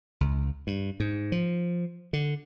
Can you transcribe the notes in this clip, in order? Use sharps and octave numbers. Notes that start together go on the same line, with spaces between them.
C#2
G2
G#2
F3
D3